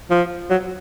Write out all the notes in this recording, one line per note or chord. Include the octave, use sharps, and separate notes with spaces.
F3
F#3